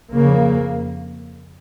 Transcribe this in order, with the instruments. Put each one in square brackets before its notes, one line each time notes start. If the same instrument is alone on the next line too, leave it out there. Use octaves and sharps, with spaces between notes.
[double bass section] F2 C#3 A#3